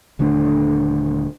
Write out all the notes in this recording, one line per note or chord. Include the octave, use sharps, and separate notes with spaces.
D#1 D3 A3 D4